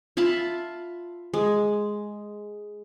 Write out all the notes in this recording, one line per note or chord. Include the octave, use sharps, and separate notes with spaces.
F4 E5 A5 B5
G#3